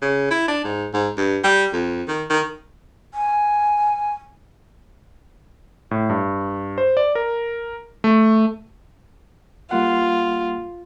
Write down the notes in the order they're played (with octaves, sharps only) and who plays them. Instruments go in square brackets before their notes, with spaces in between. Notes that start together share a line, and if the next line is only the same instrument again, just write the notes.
[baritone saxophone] C#3
E4
D4
G#2
G#2
G2
G3
F2
D#3
D#3
[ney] G#5
[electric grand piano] A2
G2
C5
D5
A#4
A3
[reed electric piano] G3 A#3 F#5 [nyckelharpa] F4